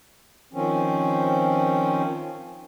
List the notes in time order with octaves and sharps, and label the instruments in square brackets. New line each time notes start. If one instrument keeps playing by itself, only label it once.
[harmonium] D#3 F3 C4 C#4